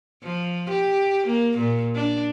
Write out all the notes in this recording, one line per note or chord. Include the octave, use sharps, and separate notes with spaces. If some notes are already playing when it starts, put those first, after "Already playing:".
F3
G4
A#3
A#2
D4